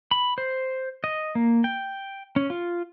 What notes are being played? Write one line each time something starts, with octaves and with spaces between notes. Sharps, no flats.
B5
C5
D#5
A#3
G5
C#4
F4